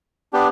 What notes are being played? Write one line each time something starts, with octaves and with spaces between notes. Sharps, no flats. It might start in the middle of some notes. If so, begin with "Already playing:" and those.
B3 D4 G4